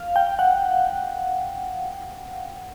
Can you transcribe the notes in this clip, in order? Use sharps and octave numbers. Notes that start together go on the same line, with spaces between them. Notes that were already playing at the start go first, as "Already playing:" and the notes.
Already playing: F5
G5
F#5